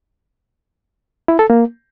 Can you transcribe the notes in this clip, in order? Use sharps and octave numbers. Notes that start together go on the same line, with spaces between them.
E4
A4
A#3